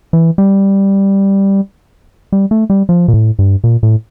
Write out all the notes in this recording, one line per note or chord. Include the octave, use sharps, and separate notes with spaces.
E3
G3
G3
A3
G3
F3
A#2
A2
G2
A#2
A2